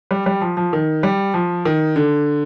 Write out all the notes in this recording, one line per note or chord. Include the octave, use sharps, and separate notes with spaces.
G3
G3
F3
F3
D#3
G3
F3
D#3
D3